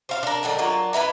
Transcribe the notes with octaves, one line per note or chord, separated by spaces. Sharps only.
C5 F5
D4 A#4
D3 D#3 F#3 D4
F#3 A#3 D4 F4
E4 B4 E5 A#5